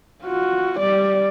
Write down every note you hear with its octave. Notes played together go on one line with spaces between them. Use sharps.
F4 F#4
G3 D5